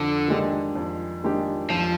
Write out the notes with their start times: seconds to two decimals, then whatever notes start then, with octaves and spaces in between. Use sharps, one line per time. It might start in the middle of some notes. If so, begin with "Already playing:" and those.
Already playing: F2 D3
0.28 D#3 G#3 D4 G4
0.75 F2
1.24 D#3 G#3 D4 G4
1.70 F2 F3